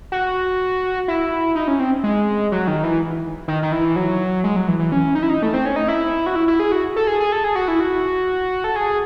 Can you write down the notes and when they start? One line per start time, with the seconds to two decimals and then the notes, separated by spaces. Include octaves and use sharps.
0.12 F#4
1.08 E4
1.55 D#4
1.68 C#4
1.79 C4
2.04 G#3
2.52 F#3
2.67 D#3
2.84 E3
3.48 D#3
3.63 D#3
3.72 E3
3.96 F#3
4.44 G#3
4.56 F#3
4.68 E3
4.79 E3
4.92 C#4
5.15 D#4
5.23 E4
5.30 D#4
5.43 A3
5.54 C4
5.66 C#4
5.76 D#4
5.88 E4
6.26 F#4
6.36 E4
6.48 E4
6.60 G#4
6.72 F#4
6.96 A4
7.07 G#4
7.20 G#4
7.32 A4
7.44 G#4
7.56 F#4
7.68 E4
7.80 F#4
8.64 A4
8.76 G#4